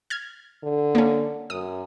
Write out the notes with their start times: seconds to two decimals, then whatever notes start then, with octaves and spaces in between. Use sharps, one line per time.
0.10 F6 G#6
0.63 D3
0.95 A#3 C#4
1.50 F#2 D#6